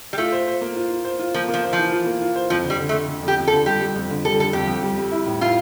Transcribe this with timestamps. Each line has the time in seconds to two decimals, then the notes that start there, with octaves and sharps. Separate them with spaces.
0.13 G3
0.18 A3 F4
0.32 C5
0.47 C5
0.61 A#3
0.76 F4
0.90 F4
1.05 C5
1.19 F4
1.34 F3 A#3
1.48 A#3
1.54 F3
1.63 C5
1.73 E3 F3
1.92 F4
2.06 A#3
2.21 F4
2.36 C5
2.50 F2 F3
2.65 D3
2.70 G3
2.80 D3
2.89 A3
2.93 D3
3.08 D3
3.23 F2 G4
3.37 F2
3.48 A4
3.53 D3
3.66 G3 G4
3.81 G3
3.96 F2
4.10 D3
4.25 G3 A4
4.39 D3 A4
4.53 F2 G4
4.68 F2
4.83 G3
4.98 G3
5.12 E4
5.26 A2
5.41 E4 F4